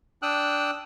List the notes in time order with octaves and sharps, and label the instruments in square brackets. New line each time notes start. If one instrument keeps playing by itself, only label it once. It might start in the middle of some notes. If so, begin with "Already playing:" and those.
[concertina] D4 G5 D#6 E6 F#6